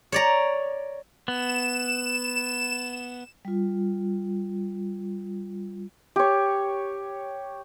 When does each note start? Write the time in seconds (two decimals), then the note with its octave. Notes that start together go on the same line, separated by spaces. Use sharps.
0.12 C#5 D5 A#5
1.28 B3 E7
3.45 G3 F4
6.16 G4 C#5